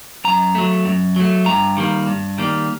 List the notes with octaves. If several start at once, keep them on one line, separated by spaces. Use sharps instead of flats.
F#2 A#5
F#3 A3
F#2
F#3 A3
G2 A#5
D#3 G3 A#3
G2
D#3 G3 A#3